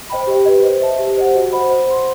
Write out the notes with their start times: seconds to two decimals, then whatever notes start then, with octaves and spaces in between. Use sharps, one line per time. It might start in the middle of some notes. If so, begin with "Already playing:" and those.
0.10 C5 D#5 G5 B5
0.27 G4
0.45 B4 D#5
0.64 C5
0.81 E5 A5
0.99 G4
1.16 C5 D#5 F#5
1.34 F#4
1.52 C5 D#5 F#5 B5
1.70 C5
1.88 F#5 C6